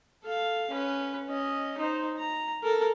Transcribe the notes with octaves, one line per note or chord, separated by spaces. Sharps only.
A4 F5
C#4 B4
C#4 D#5
D#4 C5
A#5
A4 A#4